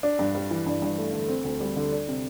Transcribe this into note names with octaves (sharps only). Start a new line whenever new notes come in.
D4
G2
G3
E3
G2
G2
A3
D3
C4
D2
G3
D3
D4
C3